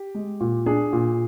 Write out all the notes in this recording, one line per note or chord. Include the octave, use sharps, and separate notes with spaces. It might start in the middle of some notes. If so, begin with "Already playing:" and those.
Already playing: G4
G#3
A#2
D4 G#4
A#2